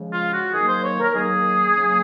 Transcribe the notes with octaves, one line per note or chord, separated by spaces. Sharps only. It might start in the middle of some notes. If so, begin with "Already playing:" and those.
Already playing: C#3 F3 G#3
F4
F#4
D#3 F#3 A#3 G#4
C5
C#5
A#4
D#3 F#3 A#3 G#4
C#3 F#3 A#3